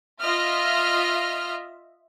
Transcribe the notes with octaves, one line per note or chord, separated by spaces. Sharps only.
F4 D#5 E5 F6